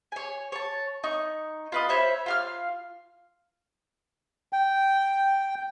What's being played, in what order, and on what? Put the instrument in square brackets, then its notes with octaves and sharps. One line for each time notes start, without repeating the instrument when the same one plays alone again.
[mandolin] C#5 G#5
C#5 A5
D#4 C#6
F4 B4 D#5
C5 C#5 E5 B5
F4 F5 F6
[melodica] G5